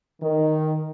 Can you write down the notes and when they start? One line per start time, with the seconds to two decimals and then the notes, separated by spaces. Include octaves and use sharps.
0.22 D#3